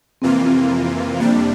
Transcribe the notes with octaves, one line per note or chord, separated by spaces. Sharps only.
F2 C3 E3 A#3 C4 F4
C4
F2 C3 G3 A#3 D4